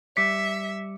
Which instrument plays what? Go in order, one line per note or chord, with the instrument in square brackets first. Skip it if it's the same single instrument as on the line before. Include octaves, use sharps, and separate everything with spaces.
[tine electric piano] G3 D6 C#7 [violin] E5 [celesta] B6